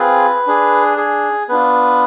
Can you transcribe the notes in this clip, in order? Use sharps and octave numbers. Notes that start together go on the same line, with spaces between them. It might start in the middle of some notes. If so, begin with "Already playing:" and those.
Already playing: C4 F4 G#4 B4
D4 G#4
G#4
B3 D4 F4 B4